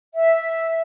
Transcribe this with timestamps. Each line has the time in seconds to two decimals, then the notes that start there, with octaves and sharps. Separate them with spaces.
0.14 E5